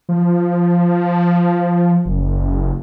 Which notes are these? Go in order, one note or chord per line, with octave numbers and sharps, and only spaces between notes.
F3
F#1